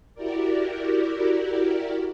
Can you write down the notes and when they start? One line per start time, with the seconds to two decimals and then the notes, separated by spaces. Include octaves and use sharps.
0.14 E4 F#4 G4 A#4 D5